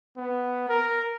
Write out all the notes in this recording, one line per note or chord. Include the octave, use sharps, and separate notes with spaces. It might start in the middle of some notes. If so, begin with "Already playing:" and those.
B3
A#4